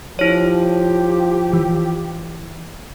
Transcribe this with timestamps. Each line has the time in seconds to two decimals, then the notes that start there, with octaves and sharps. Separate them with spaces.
0.19 F3 E4 G4 C#5
1.53 E3